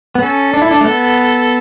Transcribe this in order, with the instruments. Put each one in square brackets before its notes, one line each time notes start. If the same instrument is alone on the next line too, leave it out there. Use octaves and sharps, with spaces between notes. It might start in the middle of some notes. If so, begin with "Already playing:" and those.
[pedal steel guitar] B3
[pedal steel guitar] C#4 [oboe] A4
[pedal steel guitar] D4
E4
D4
A3
B3